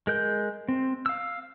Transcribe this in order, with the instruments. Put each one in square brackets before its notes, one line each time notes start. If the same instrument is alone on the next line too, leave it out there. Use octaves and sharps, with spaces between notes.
[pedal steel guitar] G#3 A#4 G6
C4
F5 E6